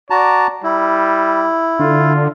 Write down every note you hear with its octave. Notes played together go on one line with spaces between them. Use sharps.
F#4 D5 A5 A#5
G3 E4
D3 F4